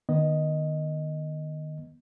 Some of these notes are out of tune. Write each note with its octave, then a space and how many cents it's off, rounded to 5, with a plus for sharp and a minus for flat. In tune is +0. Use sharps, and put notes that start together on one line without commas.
D#3 -30 B3 -25 D#5 +0